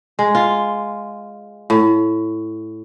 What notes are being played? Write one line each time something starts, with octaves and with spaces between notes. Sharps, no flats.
G#3
F4
A2